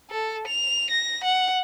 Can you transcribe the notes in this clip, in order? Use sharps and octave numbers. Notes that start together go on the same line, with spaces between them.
A4
F7
A#6
F#5